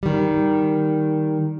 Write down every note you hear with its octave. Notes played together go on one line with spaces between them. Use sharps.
D#3 G3